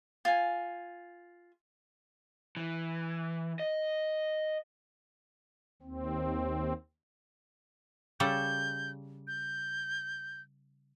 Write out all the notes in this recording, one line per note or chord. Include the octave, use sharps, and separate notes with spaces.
F4 G#5
E3
D#5
D#2 C4
C#3 G3 A4 G6
G6